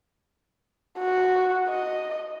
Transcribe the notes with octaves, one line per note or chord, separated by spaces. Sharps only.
F#4
D#5